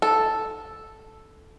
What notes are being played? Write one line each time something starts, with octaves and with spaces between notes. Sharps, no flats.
A4